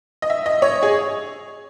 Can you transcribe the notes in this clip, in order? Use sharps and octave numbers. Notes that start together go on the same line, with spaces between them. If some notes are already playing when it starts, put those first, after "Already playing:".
D#5
E5
D#5
C#5
G#4